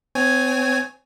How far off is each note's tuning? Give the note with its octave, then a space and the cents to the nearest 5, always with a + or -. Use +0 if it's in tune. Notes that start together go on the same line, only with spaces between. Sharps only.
C4 -35 C#5 +0 G#5 +0